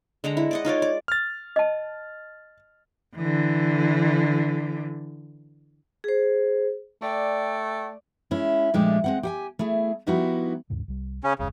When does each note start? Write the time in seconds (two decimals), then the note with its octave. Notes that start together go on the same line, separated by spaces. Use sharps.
0.24 D3 G#3 F#5 A#5
0.37 E4
0.51 D5 D#5 F#5
0.65 D#4 F4 C#5 D5
0.82 D5
1.08 F6 A6
1.56 D#5 A5
3.16 D3 E3
6.04 G#4 C5
7.02 A3 D5 G5
8.31 G#3 C#4 E4
8.74 A#2 F3 G#3 A3 D4 G4
9.04 G#3 C4 F#5
9.23 G4 F#5 G#5
9.59 A3 E4 G#4
10.07 F3 G3 B3 D#4 E4 F#4
10.70 D#2 G#2 C#3
10.88 C2 G3
11.24 C#3 C#4
11.39 F#1 D#2 C#3 G#3